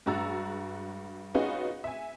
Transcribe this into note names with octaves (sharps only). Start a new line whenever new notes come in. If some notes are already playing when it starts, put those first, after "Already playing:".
G2 G#3 F#4 A#5 E6 A6
B3 C#4 D#4 F4 F#4 G#4
E5 G#5